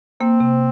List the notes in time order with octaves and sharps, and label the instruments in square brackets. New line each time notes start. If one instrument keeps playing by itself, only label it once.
[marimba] A#3 [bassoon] C4
[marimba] C3